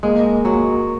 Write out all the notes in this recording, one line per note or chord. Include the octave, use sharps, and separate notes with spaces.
G#3 A#3
F#3 A#3